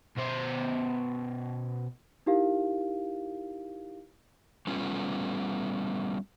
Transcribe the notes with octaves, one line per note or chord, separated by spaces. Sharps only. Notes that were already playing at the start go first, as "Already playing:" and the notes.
B2 C5
D#4 E4 G4 A#4 F5
G3 A3 B3 C#4 F4